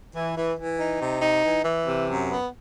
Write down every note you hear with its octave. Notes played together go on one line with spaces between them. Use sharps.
E3
E3
E3
D#4
C3
D#4
E3
E3
C3
F#2
B3